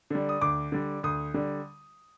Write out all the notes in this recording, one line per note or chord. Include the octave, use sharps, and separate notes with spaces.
D3 G3
D#6
D2 D6
D3 G3
D2 D#6
D3 G3